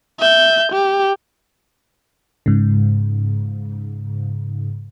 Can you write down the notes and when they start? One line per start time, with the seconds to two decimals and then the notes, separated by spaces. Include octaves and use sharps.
0.20 E5 G6
0.72 G4
2.46 G#2 C#3